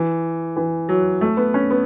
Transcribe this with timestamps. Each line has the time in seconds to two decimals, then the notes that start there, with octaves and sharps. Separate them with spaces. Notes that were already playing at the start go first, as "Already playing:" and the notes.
Already playing: E3
0.56 E3
0.89 F#3
1.21 A3
1.37 B3
1.54 C#4
1.70 B3